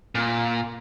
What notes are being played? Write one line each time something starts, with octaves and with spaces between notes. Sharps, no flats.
A#2